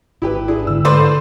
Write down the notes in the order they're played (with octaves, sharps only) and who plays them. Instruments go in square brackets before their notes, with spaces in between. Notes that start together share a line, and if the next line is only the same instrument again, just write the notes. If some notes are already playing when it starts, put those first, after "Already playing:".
[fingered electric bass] G#1 [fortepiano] E4 G4 B4
[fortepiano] D4 E4 G#4
[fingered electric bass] G#2 D3 [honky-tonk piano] E6
[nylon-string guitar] A4 B4 [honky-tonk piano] C5 D5 C6